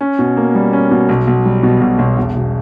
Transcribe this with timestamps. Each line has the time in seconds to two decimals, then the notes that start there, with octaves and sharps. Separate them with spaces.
0.01 C#4
0.19 B2
0.37 A#3
0.55 G3
0.73 C#4
0.91 B2
1.09 B1
1.27 B1
1.45 G3
1.63 B2
1.81 B1
1.99 B1
2.17 E1
2.36 E1